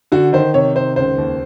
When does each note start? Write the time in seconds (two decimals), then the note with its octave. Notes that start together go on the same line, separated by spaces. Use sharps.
0.12 D3 F#4
0.33 D#3 C5
0.54 C3 C#5
0.75 D#3 C5
0.96 C#2 C5
1.18 D#2